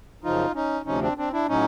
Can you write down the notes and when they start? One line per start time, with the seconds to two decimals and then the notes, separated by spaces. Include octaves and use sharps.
0.24 F#2 C#3 F3 D#4 F4
0.54 C#4 D#4
0.86 D2 C3 F3 C#4 D#4
1.02 C4 D4
1.18 C4 D4
1.32 D4 E4
1.48 A2 F#3 C#4 D#4